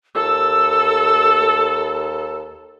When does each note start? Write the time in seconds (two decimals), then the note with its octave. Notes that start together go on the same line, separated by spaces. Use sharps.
0.15 D#2 A4 E6